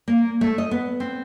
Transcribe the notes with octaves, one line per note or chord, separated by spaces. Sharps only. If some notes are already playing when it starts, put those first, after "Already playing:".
A#3
A3
D#5
B3
C4